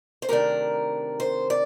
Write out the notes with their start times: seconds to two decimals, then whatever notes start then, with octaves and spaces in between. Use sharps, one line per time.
0.22 C5
0.29 C3 D#3 A3 D4 A#4
1.20 C5
1.50 D5